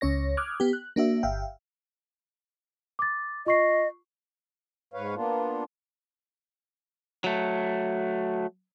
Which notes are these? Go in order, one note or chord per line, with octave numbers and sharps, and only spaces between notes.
C#2 C#4 C#5 A#6
D6 D#6 F6 F#6 G#6
B3 G4
F#6
A#3 D4 F#4 E5
G1 E5 F5 G5
D6 A6
F4 D#5 C#6 C7
G#2 B4 C#5 F5
A#3 B3 D4 F4
F#3 A3